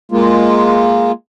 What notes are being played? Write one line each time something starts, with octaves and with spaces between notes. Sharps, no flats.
G#3 A#3 F4